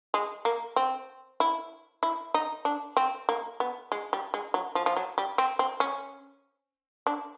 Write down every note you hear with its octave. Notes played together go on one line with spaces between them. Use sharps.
G#3
A#3
C4
E4
E4
D#4
D4
C4
A#3
B3
G#3
G3
G#3
F#3
F3
F3
F#3
G3
C4
C4
C#4
D4